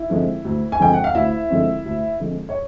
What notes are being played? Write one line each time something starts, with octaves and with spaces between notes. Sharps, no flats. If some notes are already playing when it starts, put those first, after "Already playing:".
Already playing: E4
D3 F3 G#3 C4
D2
G#5
D3 F3 G#3 C4 G5
F#5
F5
D2 E4 E5
D3 F3 G#3 C4
D2
D3 F3 G#3 C4
C#5